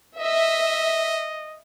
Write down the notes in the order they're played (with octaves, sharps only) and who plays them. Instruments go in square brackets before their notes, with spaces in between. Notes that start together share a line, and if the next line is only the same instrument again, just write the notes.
[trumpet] D#5 [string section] E5